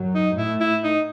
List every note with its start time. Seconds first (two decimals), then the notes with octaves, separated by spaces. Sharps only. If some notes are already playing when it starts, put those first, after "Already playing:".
Already playing: F#2 F#3
0.15 D#4
0.37 A2 A3 E4
0.60 E4
0.84 D#4